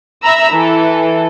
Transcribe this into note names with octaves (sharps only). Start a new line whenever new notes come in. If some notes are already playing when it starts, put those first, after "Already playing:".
E5 A#5 B5 E6
E3 A4